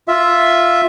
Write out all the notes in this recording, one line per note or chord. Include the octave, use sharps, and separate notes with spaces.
F4 E5